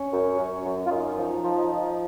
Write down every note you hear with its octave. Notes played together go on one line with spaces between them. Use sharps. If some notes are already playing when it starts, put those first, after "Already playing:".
Already playing: C#4
F#2
F#2
F#2
F4
F#2 D#4
F3
F3
F3